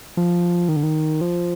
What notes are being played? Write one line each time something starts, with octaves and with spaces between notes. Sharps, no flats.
F3
D#3
D3
D#3
F3